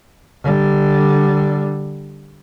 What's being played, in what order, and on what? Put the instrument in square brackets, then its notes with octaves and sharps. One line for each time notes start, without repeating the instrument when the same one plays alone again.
[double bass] D3 G3